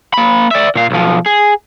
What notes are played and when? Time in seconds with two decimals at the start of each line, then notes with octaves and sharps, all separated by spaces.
0.14 A#3 B5
0.51 D5 E5
0.75 A#2 F5
0.91 B1 F3
1.26 G#4